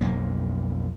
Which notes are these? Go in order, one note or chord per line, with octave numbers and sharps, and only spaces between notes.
B1 F2 A#3